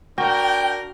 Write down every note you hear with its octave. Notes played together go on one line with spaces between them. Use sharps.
D4 F#4 A#4 G5